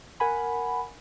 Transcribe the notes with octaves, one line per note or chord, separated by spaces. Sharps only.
A#4 F#5 G#5 B5